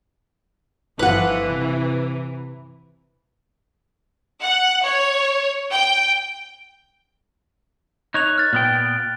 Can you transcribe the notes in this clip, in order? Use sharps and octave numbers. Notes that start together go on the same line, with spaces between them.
G1 E3 F3 B4 F#5
C3
F#5
C#5
G5
D#4 C#5 F#6 F7
F6 A6
A#2 B3 G5